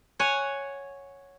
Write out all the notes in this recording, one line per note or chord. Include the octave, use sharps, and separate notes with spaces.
C#5 F#5 G#5